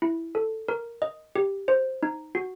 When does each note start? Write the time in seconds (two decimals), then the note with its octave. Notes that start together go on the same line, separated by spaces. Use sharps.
0.02 E4
0.35 A4
0.68 A#4
1.02 D#5
1.36 G4
1.68 C5
2.03 D#4
2.35 F#4